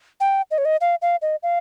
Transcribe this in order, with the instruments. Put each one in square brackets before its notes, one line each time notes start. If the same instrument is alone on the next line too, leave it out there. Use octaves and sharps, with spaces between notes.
[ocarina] G5
D#5
C#5
D#5
F5
F5
D#5
F5